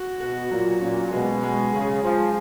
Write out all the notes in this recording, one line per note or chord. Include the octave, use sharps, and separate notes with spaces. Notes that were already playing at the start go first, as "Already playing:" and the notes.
Already playing: F#4
B2 F#4
A#2 F#3
A#2 C#4
B2 G#3
G#3
C#3 G#4
F3 G#3